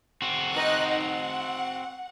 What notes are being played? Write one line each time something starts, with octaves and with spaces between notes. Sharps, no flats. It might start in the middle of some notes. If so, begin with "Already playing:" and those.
C4 F#4
D#4 F#6
F#5